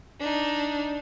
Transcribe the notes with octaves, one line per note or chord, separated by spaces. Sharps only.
D4 D#4